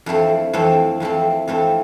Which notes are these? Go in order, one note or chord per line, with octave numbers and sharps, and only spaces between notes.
F2 E3 A3 C4
F2 E3 A3 C4
F2 E3 A3 C4
F2 E3 A3 C4